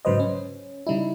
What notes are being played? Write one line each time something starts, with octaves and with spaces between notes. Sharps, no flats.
G#2 C#3 F#3 B4 C5 D#5
C#4
C#3 G3 D#4 E4